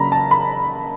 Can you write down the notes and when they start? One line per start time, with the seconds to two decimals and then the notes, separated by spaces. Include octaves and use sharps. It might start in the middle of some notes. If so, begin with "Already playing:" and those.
Already playing: C#3 F#3 A#3 D4 A#5 B5
0.12 A5
0.31 B5